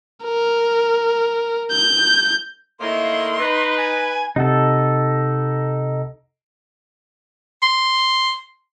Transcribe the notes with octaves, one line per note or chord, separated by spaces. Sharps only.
A#4
G6
A2 D#3 A#3 E4 D#5 C6
D#4 B4
G#5
C3 D#4 A4 F#5
C6